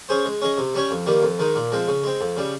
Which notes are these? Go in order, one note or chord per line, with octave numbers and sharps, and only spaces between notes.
C#4 G#4 C5
G#3
C#4 G#4 D#5
C3
G3 C#4 G4 C#5
F2
D#3 G3 A#3
F2
D#3 G#3 D#4
A#2
F3 G#3 C4
C#3
G#3 C4
F2
C#3 G3